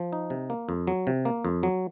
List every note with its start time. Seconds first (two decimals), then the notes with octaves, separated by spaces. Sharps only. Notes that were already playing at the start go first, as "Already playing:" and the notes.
Already playing: F3
0.13 D#4
0.30 C3
0.50 A#3
0.69 F2
0.87 F#3
1.07 C3
1.25 A#3
1.45 F2
1.63 F#3